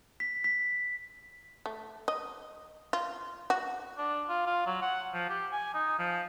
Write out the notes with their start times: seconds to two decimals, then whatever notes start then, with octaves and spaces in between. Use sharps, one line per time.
0.20 B6
0.44 B6
1.66 A3
2.08 D#5
2.93 F4
3.50 F#4
3.98 D4
4.29 F4
4.47 F4
4.66 F#3
4.82 F#5
5.14 F3
5.30 G4
5.52 G#5
5.74 D#4
5.99 F3